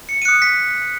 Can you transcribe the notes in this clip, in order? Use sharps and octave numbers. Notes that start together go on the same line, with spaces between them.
C#7
D#7
D#6 F#6 C#7
B6